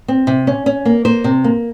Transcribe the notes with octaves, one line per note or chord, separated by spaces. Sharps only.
C4
C3
C#4
C#4
A#3
A#3 C5
C3
A#3